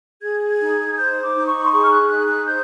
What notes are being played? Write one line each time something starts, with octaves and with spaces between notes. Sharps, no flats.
G#4 G#6
G#6
D#4
C5 G6
D6
D#4
C#6
C6
G#4 C#6
F6
F#6
D#4 F#6
F#6
C5 G6